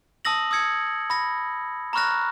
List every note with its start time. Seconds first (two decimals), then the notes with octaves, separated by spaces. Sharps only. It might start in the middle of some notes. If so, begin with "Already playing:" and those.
0.25 A5 D#6 E6 A#6 F#7
0.51 D#6 E6 G#6 C#7
1.10 B5 A#6
1.93 A#5 B5 C#6 F6 F#6 A#6